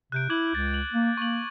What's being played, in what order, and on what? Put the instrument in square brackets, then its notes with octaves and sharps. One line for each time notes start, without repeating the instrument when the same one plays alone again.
[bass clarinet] C3 [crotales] F#6 G6 D7
[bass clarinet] E4 [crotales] D6 G#6 F#7
[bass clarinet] C#2 [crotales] A6
[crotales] F#7
[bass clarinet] A#3
[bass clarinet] A#3 [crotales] C#6 F#7